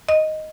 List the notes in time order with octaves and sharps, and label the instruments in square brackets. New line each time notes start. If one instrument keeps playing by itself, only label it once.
[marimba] D#5